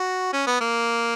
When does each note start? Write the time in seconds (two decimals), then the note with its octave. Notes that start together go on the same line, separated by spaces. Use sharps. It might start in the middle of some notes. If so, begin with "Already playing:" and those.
Already playing: F#4
0.33 C#4
0.46 B3
0.61 A#3